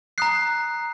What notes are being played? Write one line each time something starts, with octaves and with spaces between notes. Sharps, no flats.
A#5 D#6 F#6 C7